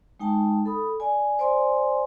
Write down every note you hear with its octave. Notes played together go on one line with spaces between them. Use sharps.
G#3 D#4 G5 A5
A4 B5 D#6
D5 G#5
C5 D5 G#5 C6